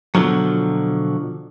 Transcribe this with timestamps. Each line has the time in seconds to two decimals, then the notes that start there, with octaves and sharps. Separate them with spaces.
0.15 B2 D3 F3 F#3